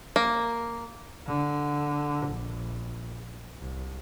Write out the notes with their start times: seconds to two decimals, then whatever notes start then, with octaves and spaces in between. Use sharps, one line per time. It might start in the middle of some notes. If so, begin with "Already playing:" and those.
0.16 A#3
1.27 D3
2.26 A#1
3.57 C2